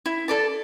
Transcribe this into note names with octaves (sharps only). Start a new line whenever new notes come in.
E4
A4 D5 A5